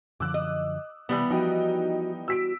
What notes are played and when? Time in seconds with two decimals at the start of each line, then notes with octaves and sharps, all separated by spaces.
0.20 F#2 D3 F3 D6 E6 F#6
0.34 D#5
1.09 C3 E3 G3 B3
1.30 F3 D#4 F#4 D#5 G5
2.28 F#4 E6 B6 D7